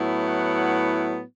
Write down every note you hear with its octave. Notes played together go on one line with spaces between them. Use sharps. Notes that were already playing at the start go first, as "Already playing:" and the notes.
Already playing: A2 F#3 B3 E4
F#5